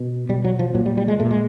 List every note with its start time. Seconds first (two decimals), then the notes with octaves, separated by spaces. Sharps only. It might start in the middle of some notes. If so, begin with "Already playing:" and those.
Already playing: B2
0.29 B2 G3
0.44 F#3
0.59 F3
0.75 A#2 F#3
0.86 G3
0.97 G3
1.08 G#3
1.20 A#2 A3
1.31 G#3